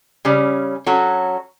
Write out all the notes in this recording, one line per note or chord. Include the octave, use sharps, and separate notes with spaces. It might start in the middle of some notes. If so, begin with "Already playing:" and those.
C#3 G3 C#4
F#3 C#4 F#4 A4